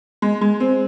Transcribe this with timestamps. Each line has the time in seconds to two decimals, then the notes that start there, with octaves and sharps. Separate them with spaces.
0.22 G#3
0.41 G#3
0.60 C4